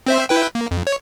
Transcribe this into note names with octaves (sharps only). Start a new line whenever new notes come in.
C4 C5 E5
E4 B4 G5
A#3
F2
C#5